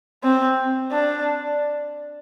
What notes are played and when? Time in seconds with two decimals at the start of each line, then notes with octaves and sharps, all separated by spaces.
0.24 C4
0.92 D4